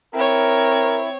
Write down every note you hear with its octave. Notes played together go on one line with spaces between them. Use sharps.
C4 E4 A#4 C#5